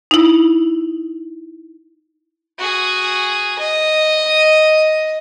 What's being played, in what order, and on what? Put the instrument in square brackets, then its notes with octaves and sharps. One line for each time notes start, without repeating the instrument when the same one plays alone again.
[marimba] D#4 E4
[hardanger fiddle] F#4 G#4
D#5